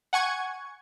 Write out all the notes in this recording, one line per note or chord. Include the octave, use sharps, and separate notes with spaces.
F#5 G#5 C#6 G#6